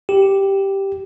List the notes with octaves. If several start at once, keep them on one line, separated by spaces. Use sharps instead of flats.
G4